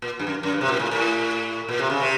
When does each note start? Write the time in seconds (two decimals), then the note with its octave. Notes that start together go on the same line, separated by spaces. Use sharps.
0.02 A#2
0.19 G2
0.27 F#2
0.43 F#2
0.52 G2
0.61 C3
0.68 A#2
0.79 A2
0.91 A2
1.69 A#2
1.79 C3
1.90 C#3
2.01 C3